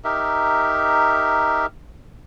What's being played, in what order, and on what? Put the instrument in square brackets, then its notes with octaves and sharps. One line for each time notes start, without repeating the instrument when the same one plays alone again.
[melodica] D#4 G4 A#4 E5